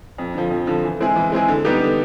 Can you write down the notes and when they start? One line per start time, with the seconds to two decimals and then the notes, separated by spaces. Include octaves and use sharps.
0.18 F2
0.34 D3 F3
0.51 F2
0.67 D3 F3
0.84 E3
1.00 G#3 C4 E4 G#4
1.16 E3
1.32 G#3 C4 E4 G#4
1.48 D3
1.65 G3 B3 D#4 G4
1.81 D3